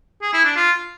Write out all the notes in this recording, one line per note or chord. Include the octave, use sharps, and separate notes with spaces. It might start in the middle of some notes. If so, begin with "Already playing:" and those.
G#4
E4
D4
F4